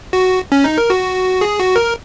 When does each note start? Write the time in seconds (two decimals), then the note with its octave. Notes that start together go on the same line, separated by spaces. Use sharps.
0.13 F#4
0.52 C#4
0.64 D#4
0.78 A#4
0.90 F#4
1.41 G#4
1.59 F#4
1.76 A#4